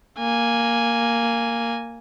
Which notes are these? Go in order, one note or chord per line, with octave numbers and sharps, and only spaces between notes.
A#3 G#5